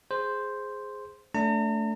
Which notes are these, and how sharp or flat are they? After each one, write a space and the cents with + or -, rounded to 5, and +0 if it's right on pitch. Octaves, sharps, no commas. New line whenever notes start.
G#4 +0 C5 +0
A3 +0 D4 -30 A#5 -45